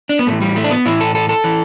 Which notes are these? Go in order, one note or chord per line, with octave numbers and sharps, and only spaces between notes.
D4
B3
A2 E3 A3
G3
A3
D4
B3
A2 E3 E4
A4
A4
A4
E3